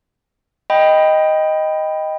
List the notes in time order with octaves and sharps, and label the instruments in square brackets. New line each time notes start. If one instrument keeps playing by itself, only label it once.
[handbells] D#5 G5 B5